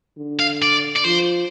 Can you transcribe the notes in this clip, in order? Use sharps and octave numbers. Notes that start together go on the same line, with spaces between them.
D3
F5
D5
D5
F3 C5